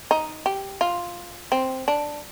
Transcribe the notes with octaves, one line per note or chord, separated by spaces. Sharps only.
D#4
G4
F4
C4
D4